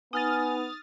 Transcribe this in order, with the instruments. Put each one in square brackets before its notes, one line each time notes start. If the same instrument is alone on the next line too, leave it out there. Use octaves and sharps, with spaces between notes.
[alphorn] B3 [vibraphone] D#4 [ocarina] G#5 [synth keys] D#6 F6 A6